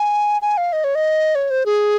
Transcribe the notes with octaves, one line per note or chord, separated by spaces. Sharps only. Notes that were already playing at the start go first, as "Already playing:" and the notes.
Already playing: G#5
G#5
F5
D#5
C#5
D#5
C#5
C5
G#4